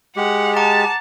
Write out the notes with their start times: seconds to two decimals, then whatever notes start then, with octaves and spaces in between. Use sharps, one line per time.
0.17 G#3 G4 F#5
0.56 F#5 A5 A#5 D6